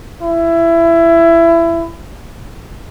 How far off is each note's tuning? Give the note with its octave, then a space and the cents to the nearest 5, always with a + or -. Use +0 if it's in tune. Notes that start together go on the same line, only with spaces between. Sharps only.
E4 +20